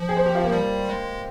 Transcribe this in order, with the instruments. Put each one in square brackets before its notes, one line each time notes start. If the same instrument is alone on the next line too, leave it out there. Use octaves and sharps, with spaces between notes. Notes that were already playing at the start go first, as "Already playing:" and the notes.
Already playing: [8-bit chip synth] F3
[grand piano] G#4
C5
G4
F4
A#3
[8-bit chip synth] G3
G#3